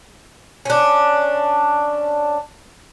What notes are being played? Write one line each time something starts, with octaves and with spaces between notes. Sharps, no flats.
C#4 D4